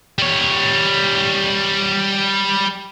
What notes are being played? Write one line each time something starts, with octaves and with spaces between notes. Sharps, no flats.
G3 C#5